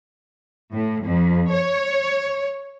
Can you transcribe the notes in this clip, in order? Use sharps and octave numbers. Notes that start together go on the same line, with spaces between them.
A2
F2
C#5